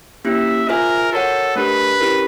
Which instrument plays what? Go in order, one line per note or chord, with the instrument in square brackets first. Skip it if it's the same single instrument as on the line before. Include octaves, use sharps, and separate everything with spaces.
[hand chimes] A#3 C#4 E4 G4 [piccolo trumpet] E5
[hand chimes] F4 G#4 C5 E5 G#5 [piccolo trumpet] A#4
[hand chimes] F#4 A#4 C#5 F#5 [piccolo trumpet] A4
[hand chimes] A3 D4 G4 A#4 [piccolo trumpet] B4
[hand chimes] C#4 E4 G4 A#4